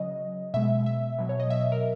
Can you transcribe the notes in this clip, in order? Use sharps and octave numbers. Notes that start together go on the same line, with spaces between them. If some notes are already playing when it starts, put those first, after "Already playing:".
Already playing: C#3 F#3 D#5
B2 G#3 E5
E5
B2 F#3
C#5
D#5
E5
E5
A#4